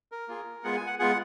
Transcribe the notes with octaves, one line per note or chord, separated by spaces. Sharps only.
A#4
A#3 F4 G#4
G#3 B3 F4 G#4 F#5
G#5
F#5
G#3 B3 F4 G#4 F#5